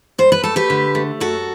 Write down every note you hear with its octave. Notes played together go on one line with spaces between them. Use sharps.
G2 C5
B4
A3 A4
G4 B4
D3
A3
F#2 F#4 A4